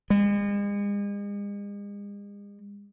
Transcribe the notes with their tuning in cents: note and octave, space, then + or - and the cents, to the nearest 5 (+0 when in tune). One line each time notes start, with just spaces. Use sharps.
G#3 -40